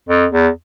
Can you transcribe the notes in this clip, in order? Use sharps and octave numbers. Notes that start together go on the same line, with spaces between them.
F2
E2